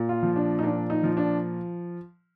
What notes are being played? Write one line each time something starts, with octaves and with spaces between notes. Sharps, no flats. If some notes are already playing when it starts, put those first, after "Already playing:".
Already playing: A#2
F4
F3
D4
D#4
A#2 D4
D#4
F3
D4